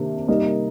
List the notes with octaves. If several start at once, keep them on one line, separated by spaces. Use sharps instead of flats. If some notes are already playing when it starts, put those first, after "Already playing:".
Already playing: C3 D#3 A#3 D4
G3 A#3 D#4 A#4 D#5